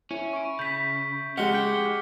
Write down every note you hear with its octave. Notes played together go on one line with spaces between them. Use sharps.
C#4 E4
C#6 D7
C#3 G6 B6
F2 C#3 G#3 G4 F#5 F6 C#7 G7
E4 G5